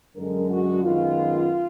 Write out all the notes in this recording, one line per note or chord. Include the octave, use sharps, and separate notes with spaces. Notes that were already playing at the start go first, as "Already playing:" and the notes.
F#2 D3 G#3 A#4
F#4
F#2 D#3 G#3 B3 F4